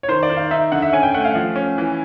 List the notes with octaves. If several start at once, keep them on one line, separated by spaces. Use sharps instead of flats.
C#5
D#3 C5
D5
D#3
F5
D#4 E5
D3 F#5
E5
C#4 G#5
G5
A3 F#5
F5
F3
C#4
E3